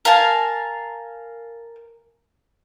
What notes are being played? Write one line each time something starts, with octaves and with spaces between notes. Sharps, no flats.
A#4 F5 G#5 A5